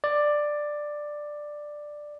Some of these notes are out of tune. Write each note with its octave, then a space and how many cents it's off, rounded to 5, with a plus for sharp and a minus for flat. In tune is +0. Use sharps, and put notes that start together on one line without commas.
D5 +10